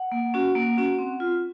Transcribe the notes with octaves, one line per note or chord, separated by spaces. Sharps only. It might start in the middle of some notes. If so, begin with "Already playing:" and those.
Already playing: F#5
A#3
C#4 F#4
A#3
C#4 F#4
C4
F4